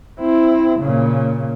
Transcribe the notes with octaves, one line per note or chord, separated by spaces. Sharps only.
C4 E4
A#2 C#3